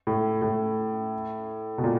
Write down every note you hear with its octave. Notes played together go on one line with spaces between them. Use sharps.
A2
A2
B2
A#2